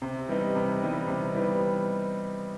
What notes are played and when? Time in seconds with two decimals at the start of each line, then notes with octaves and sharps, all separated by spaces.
0.02 C3
0.28 E3 G3 B3 D#4
0.55 C3
0.82 E3 G3 B3 D#4
1.08 C3
1.35 E3 G3 B3 D#4